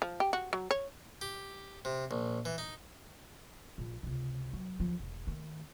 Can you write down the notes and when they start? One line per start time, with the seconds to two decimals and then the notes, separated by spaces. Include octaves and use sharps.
0.02 F3
0.20 G4
0.33 F#4
0.53 F#3
0.71 C#5
1.21 G4
1.85 C3
2.11 A#1
2.45 E3
2.58 D#4
3.78 A#1
4.03 C#2 C3
4.53 F#3
4.80 D2 F3
4.99 E1
5.27 D#3 A3